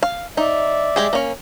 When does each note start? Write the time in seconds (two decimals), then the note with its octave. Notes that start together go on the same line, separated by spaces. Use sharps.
0.03 F5
0.37 D#4 D5 E5
0.96 G#3 G4 G#4
1.13 A#3 C#4